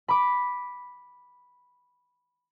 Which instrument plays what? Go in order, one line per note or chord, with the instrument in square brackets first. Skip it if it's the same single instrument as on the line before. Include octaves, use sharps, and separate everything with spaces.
[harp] B5 D6